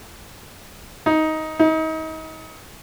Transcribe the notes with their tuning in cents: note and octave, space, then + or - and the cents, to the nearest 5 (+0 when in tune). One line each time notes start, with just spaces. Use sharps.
D#4 +15
D#4 +35